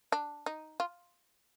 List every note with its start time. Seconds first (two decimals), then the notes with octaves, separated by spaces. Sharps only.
0.12 D4
0.46 D#4
0.80 F4